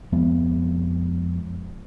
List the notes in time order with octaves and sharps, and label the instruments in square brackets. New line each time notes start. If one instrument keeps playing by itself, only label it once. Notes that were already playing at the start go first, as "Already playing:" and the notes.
[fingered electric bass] F2 F3 G#3 B3